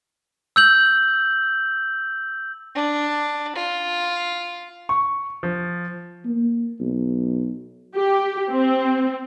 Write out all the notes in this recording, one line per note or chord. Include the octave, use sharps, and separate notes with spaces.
E6 G6 F#7
D4
F4
C#6
F3
A#3
B1
G4
C4